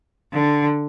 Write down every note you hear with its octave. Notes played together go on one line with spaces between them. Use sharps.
D3